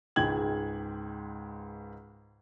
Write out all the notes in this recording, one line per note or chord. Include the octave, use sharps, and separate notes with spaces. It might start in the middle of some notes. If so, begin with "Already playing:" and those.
C#2 G#2 G#3 G5 G#6 F#7